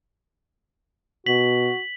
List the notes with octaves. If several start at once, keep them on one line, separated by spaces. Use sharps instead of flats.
B2 F#4 B6 F#7